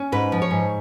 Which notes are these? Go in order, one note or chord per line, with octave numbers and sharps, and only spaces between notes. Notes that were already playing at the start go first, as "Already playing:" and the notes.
Already playing: C#4
G#2 B4
F3
C#5
G#2